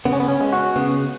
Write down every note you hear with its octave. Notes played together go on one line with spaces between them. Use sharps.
C#3 B3
C#4
B3
C#4
G#3
F#4
C#3 B3